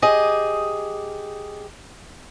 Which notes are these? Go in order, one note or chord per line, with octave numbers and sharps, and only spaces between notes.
G4 G#4 D#5